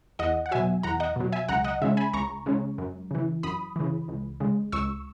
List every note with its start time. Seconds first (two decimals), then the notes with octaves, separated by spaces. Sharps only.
0.19 E2 D#5 F#5
0.46 F#5
0.51 B2 F#3 E5 G#5
0.83 E2 F#5 A#5
1.00 D#5 F#5
1.16 B2 F#3
1.32 E5 G#5
1.48 C#2 F#5 A#5
1.64 D#5 F#5
1.82 C#3 G#3 C#4 E5
1.97 G#5 B5
2.13 C#2 A#5 C#6
2.46 C#3 G#3 C#4
2.78 F#2
3.11 C#3 E3
3.43 F#2 B5 D#6
3.76 C#3 E3
4.08 C#2
4.40 C#3 G#3
4.72 C#2 C#6 E6